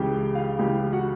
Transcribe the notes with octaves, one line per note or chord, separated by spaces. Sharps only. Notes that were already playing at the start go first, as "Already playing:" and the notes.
Already playing: C#2 C#3 E3 G4 G5
F4 F5
C#2 C#3 E3 G4 G5
F#4 F#5